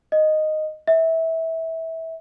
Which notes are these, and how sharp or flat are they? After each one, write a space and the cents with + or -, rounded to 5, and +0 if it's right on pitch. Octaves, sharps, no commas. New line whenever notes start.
D#5 -5
E5 -20